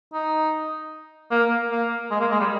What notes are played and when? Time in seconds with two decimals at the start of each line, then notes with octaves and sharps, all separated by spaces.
0.13 D#4
1.31 A#3
1.71 A#3
2.11 G#3
2.20 A#3
2.31 G#3
2.40 G3